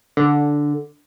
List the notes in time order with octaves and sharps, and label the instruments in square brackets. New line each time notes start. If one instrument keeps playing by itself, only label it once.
[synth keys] D3